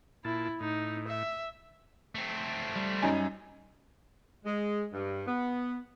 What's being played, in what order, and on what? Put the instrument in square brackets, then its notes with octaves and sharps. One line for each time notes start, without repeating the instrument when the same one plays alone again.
[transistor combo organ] A#2 A5 [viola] E4
[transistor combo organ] A2 [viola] D#4
[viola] E5
[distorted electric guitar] A3 C4
[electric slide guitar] G3
[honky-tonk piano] F#2 D#4 G#5
[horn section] G#3
G2
B3